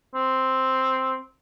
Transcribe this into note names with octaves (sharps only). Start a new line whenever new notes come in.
C4